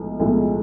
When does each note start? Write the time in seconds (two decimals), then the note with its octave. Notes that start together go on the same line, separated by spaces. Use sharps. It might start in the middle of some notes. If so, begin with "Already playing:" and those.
Already playing: B1 A2 F3 G#3
0.20 B1 A2 F3 G#3